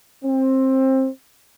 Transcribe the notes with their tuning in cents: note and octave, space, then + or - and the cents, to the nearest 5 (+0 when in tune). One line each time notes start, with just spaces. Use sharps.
C4 +20